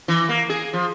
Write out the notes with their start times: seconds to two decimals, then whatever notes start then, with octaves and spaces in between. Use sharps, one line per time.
0.08 E3
0.29 A#3
0.50 G#4
0.73 F3